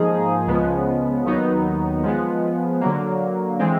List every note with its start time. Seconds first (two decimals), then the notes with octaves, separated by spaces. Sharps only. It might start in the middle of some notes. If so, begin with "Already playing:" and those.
Already playing: G#2 F3 A#3 D#4 G#4
0.47 C#2 C#3 F3 G#3 B3
1.25 D#2 D#3 F#3 B3 D#4
2.03 F3 G#3 B3
2.81 D3 F#3 A#3
3.59 E3 G#3 C4